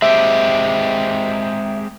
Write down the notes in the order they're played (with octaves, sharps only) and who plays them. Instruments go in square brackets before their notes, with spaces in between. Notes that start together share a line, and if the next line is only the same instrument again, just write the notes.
[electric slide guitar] G#3 C4 G4 [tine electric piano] E5